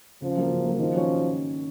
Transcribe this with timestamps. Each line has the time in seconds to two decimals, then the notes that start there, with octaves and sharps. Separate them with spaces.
0.22 C#3 F3
0.36 F#3 A#3
0.50 C#3
0.65 F#3 A#3
0.79 D#3 F3
0.94 F#3 C#4 F#4 C#5